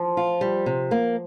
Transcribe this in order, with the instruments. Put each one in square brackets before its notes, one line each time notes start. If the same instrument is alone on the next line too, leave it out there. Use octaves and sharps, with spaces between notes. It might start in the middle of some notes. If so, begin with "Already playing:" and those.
Already playing: [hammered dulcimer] F3
[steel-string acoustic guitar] F4
G3
C3
A#3